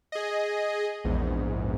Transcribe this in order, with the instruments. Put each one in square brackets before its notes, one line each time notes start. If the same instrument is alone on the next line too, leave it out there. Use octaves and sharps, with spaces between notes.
[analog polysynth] G#4 D#5
A#1 E2 G#2